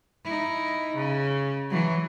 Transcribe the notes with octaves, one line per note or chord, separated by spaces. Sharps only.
D#4 E4
C#3
E3 F#3